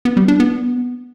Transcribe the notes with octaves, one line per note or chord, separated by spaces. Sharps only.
B3
G3
D4
B3